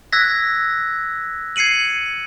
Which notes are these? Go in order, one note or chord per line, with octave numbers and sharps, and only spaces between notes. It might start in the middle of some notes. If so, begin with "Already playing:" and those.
E6 F#6 G#6 A#6 B6
G#6 C7 C#7 D#7 F#7